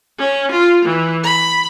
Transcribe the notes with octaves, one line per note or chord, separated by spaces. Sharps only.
C#4
F4
E3
B5